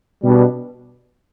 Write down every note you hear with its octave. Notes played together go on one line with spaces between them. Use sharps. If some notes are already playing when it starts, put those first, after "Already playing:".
B2 G3 D4